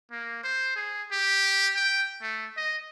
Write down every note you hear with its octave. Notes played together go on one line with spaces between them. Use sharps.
A#3
C5
G#4
G4
G5
A3
D#5